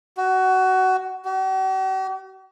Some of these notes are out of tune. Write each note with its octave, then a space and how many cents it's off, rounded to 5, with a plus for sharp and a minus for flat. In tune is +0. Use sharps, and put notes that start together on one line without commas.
F#4 +20
F#4 +45